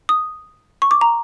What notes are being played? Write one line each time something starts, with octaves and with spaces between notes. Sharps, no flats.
D#6
C#6
D6
A#5